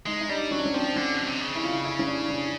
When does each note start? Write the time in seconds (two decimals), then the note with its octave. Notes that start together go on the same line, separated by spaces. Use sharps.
0.06 G#3 D#4
0.21 D#4
0.29 G3 D4
0.51 F#3 C#4
0.59 D4
0.66 C#4
0.73 F3 C4
0.96 D3 C#4
1.14 B2
1.27 C3
1.40 C#3
1.55 E4
1.64 F4
1.72 E4
1.85 E4
1.99 C#4
2.07 D4
2.29 C#4